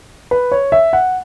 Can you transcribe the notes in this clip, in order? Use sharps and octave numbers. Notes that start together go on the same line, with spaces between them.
B4
C#5
E5
F#5